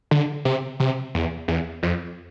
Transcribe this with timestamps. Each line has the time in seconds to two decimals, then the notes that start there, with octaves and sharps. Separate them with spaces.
0.11 D3
0.45 C3
0.80 C3
1.15 E2
1.48 E2
1.83 F2